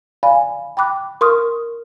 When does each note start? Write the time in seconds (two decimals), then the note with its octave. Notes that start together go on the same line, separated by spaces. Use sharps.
0.23 D5 F5 G#5 B5
0.77 G5 B5 D6 F#6
1.21 A#4 C6 C#6 D#6 F6